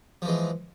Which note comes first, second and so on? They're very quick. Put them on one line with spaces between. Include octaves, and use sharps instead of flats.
F3 E3 G#3